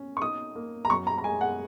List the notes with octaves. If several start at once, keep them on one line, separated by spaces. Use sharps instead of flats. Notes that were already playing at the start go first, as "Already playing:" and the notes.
Already playing: C#4
C#6
D#4 D#6
A#3
A#5
F#2 C#6
A#5
A#5
G#3 G#5
F#5